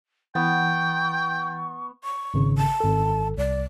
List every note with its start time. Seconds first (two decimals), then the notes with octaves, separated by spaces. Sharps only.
0.35 E3 B3 G5 C#6 A6
2.04 C#6
2.34 G#1 C#3
2.58 A5
2.80 G#1 A4
3.38 C2 D5